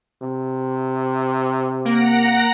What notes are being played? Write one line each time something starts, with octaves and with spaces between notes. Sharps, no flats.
C3
A#3 F#5 A#5 A#6 D7